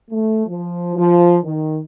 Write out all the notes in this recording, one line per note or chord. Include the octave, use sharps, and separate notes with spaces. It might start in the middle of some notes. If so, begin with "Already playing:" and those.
A3
F3
F3
D#3